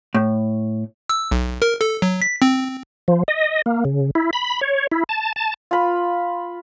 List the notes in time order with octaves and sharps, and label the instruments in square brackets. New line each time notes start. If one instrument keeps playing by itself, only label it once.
[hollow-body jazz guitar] A2
[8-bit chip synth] E6
B1
A#4
A4
F#3
B6
C4
[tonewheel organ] F3
D#5
A#3
C#3
E4
B5
C#5
E4
A5
A5
[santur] F4 B5